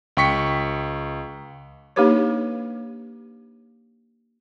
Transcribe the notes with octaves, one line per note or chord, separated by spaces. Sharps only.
C#2 G5 C#6 B6 C#7
A#3 D4 D#4 G4 B4 C#5